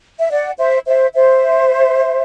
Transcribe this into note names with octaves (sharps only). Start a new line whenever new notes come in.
E5
D5 F#5
C5 E5
C5 E5
C5 E5